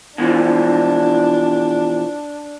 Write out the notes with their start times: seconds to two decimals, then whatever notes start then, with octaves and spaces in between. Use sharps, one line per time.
0.18 B2 E3 F3 D4